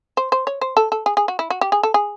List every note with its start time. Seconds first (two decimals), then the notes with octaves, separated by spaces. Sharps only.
0.17 C5
0.32 C5
0.47 C#5
0.61 C5
0.77 A4
0.92 A4
1.06 G#4
1.17 G#4
1.28 F#4
1.39 E4
1.50 F#4
1.61 G4
1.72 G#4
1.83 A4
1.94 G#4